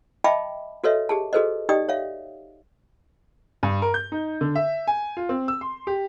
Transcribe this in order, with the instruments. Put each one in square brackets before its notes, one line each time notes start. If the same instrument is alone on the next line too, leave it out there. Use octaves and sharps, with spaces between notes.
[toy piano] D#5 E5 G5 A5 B5 D6
F#4 A4 B4 C#5 D#5 E5
G4 G#4 A5
F#4 G#4 A4 B4 C5 D#5
D#4 G4 D5 D#5 G5 D#6
C#5 E5 F5
[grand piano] G2
A#4
G6
D#4
D3
E5
G#5
F4
C4
E6
C6
G4